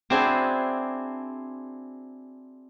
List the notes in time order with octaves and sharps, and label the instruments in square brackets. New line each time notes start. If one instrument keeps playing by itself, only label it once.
[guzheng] C4 D4 E4 F#4 G#4 C5